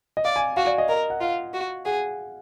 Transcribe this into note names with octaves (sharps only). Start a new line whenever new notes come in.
D#5
D5 F5
G#5
F#4 F5
D5
D#5
A#4 D#5
F#5
F4 F5
F#4
G#4 F#5